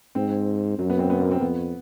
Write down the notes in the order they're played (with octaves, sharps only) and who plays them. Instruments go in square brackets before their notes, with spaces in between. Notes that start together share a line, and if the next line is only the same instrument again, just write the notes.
[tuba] G#2 [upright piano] C4
[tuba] F#2 [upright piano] F#3
[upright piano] B3
C4
B3
A#3
C4
[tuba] F2 [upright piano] B3